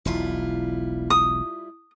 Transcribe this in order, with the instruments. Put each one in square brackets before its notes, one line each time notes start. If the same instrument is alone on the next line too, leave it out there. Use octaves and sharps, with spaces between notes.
[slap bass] E1 B1 [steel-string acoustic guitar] G3 E4 F4
[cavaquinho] D#6